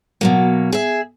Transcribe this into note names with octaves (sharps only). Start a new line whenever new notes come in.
B2 F#3 A#3
G#4 E5